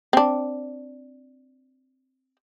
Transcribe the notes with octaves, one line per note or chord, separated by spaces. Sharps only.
C4 D4